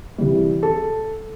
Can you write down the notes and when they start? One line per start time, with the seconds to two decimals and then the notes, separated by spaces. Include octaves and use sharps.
0.18 C3 E3 G3
0.63 A4